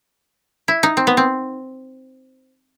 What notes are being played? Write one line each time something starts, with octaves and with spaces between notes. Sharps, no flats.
E4
D#4
C4
B3
C4